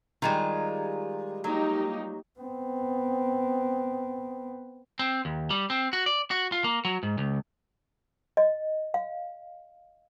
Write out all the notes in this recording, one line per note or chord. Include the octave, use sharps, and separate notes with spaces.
D#3 G3 G#3 F4
F#3 A#3 D#4 G4
B3 C4
C4
D#2
G3
C4
F#4
D5
F#4
F4
A#3
F#3
G#2
C#2
D#5
F5